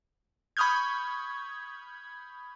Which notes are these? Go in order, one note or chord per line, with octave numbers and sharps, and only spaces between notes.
B5 C#6 D#6 F6 G6 G#6